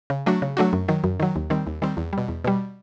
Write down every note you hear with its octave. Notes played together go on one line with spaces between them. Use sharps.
C#3
F#3 A3 D4 F#4
C#3
F#3 A3 D4 F#4
F#2
D#3 F#3
F#2
D#3 F#3
D#2
D#3 G3 C4
D#2
D#3 G3 C4
E2
B2 G3
E2
B2 G3